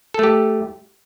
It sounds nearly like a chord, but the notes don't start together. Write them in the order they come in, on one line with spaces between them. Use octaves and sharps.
A4 A3 G4